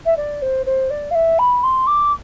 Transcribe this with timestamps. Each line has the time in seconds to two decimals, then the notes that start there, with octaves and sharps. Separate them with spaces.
0.06 E5
0.17 D5
0.42 C5
0.66 C5
0.90 D5
1.11 F5
1.15 E5
1.39 B5
1.63 C6
1.87 D6